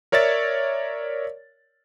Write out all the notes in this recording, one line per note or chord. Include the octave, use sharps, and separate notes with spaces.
A#4 C#5 D5 E5 A6